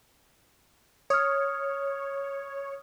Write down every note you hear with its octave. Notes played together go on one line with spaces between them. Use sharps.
C#5 D#6 F6